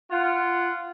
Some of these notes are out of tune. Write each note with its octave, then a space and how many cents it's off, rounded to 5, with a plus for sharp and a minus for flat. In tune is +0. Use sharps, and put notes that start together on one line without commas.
F4 -15 F#5 +0